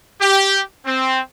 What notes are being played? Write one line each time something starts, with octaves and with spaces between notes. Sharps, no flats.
G4
C4